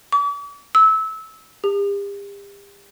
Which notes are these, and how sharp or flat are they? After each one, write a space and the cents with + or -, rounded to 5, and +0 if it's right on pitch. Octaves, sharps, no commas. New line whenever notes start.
D6 -45
E6 -20
G4 +40